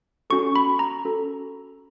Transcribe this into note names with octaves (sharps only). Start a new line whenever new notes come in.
C#4 F#4 A4 C#6
B5
A#5
C#4 F#4 A4